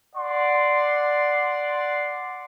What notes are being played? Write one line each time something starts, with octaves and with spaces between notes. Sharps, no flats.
D5 F#5 C6